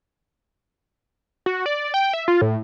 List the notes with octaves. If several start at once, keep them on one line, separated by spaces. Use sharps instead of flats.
F#4
D5
G5
E5
F4
A2